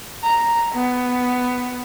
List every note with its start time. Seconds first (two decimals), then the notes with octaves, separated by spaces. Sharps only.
0.23 A#5
0.75 B3